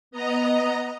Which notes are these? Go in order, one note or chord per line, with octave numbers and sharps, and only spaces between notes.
B3 D#5 A#5